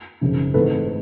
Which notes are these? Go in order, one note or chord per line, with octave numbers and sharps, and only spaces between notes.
G#1 F#2 C#3
G#2 E3 A3 C4 A4 B4